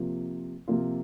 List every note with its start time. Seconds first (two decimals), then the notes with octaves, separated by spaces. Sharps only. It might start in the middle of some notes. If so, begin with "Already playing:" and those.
Already playing: C3 F3 A#3 F4
0.68 C3 F3 A#3 F4